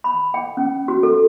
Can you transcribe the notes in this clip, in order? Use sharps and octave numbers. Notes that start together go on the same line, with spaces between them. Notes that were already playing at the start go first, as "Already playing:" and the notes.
B5
G5
C#4
F#4
A4